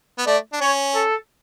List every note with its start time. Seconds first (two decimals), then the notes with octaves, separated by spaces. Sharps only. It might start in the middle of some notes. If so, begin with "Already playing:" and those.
0.18 B3
0.27 A3 D5
0.53 D4
0.61 C#4 C#5
0.95 A4